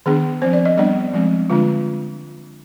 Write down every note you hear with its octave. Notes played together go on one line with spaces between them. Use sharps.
D#3 B3 D4 G#4
F3 C4 C5
D5
D#5
G3 B3 D4 D5
F3 G#3 C4
D3 G#3 D4 F4